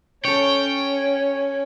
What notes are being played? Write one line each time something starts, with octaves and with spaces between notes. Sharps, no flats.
C#4 A4 C#5 G5